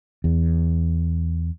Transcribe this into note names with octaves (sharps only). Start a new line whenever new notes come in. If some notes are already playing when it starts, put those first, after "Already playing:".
E2